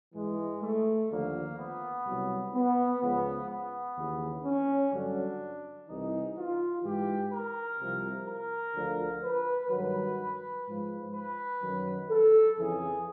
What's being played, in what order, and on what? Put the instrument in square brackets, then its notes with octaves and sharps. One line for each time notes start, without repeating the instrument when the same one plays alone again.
[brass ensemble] G#2 E3 G#3
A3
D#2 D3 F3 A#3
B3
C2 B2 F#3
B3
C#2 C#3 F3 B3
B3
D#2 C#3 E3
C#4
G2 D3 F#3 D4
C2 C3 E3 D#4
F4
G#2 E3 G4
A#4
C2 C3 F3
A#4
D2 D3 F3
B4
G2 D#3 F#3 B4
G#2 F3
B4
F#2 D#3 F#3
A4
F2 C#3 E3 G#4